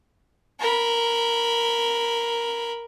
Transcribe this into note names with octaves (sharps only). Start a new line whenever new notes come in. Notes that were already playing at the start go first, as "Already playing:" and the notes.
A#4 B5